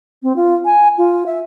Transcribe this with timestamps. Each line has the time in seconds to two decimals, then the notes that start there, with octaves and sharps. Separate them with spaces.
0.23 C4
0.36 F4
0.65 G#5
0.98 F4
1.26 E5